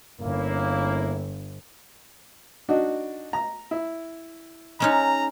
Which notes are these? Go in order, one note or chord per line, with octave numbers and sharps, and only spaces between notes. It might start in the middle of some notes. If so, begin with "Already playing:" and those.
G1 A#3 C#4 E4
D4 D#4 F#4
A#5
E4
G#3 C#4 D#4 A#5